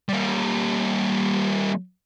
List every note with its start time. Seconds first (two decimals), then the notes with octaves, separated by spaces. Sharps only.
0.09 G3 A#3